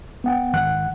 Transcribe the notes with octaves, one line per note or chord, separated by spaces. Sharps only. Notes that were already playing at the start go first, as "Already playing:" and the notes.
B3 F#5 G5
G#2 D#3 F#5 F#6